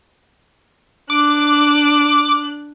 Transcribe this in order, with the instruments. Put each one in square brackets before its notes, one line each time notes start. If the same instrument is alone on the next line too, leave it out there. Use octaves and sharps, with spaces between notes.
[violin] D4 F#6 [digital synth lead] D6